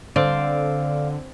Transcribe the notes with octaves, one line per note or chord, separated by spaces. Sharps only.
D3 C4 D5 F5 D6